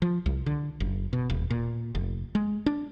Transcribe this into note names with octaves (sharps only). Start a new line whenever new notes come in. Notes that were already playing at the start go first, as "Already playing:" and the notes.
F3
C2
D3
F#1
B2
D#1
A#2
F1
G#3
D4